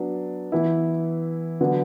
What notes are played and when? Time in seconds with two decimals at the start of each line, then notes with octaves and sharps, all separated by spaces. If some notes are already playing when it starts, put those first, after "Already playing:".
Already playing: F#3 B3 D4
0.52 E3 B3 E4
1.61 D3 F#3 B3